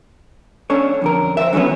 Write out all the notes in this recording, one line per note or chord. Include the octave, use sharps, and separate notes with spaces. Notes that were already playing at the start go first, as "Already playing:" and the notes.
C#4 D4 A4 C#5
F2 D3 A#4
C5 D5 E5
D3 E3 F#3 B3 C#4